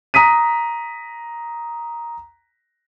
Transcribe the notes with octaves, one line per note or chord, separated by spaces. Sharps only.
A#5 D#6 B6 D#7